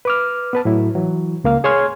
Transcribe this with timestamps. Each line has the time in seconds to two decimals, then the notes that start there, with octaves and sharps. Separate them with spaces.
0.05 B4 D6 F6
0.53 B3 B4 A5
0.65 A2 F#3 E4
0.95 E3 F#3
1.44 C#2 A#3 F5
1.64 G#4 C#5 G#5 C6 F6 G#6